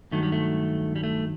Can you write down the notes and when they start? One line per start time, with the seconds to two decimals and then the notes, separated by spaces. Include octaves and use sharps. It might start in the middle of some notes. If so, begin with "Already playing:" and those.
0.11 G2 D#3 F#3 A3
0.23 G3
0.32 A3
0.96 G3
1.04 A3